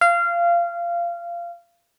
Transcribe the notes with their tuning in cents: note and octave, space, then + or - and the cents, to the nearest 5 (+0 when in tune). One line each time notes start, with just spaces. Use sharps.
F5 -20